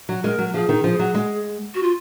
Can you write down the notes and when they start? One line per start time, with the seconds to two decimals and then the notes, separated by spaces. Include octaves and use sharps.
0.09 F#3
0.24 G#3 A#4
0.38 F#3
0.54 F3 G#4
0.69 D#3
0.84 F3
0.99 F#3
1.15 G#3
1.75 F#4
1.83 F4